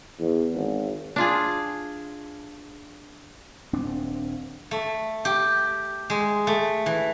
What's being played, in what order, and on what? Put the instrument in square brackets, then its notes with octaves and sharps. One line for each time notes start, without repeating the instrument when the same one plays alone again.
[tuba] E2
G#1
[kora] D4 F4 G#4
[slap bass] D#1 C4 D4
[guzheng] A3
G4
G#3
A3
E3